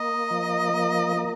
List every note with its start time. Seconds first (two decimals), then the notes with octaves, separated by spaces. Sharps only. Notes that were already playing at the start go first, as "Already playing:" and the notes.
Already playing: A#3 D#5
0.31 F3
0.74 A#3
1.17 A#3